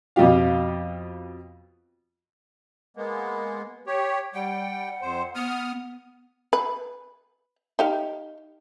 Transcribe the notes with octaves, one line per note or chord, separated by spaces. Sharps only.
F2 B2 F3 G4 F5
G#3 A#3 B3
G4 C#5
G3 F#5 G5
F2 C5
B3 D#6 F6
B4
D#4 G4 F5